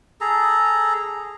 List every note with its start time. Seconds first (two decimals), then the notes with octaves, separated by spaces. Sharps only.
0.21 G#4 A4 A#5